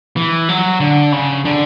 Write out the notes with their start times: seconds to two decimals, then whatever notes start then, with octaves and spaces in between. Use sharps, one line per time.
0.16 E3
0.49 F#3
0.80 D3
1.12 C#3
1.45 D3